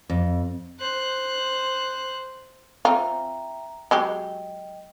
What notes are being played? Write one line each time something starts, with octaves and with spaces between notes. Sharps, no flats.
F2
C5 F#6
C4 F4 E5 G5 A#5
F#3 G#3 G4 D#5 G5